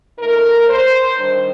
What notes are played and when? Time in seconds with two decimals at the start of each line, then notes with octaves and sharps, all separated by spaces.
0.19 A#2 A3 D#4 A#4
0.68 C5
1.18 D#3 G3 D4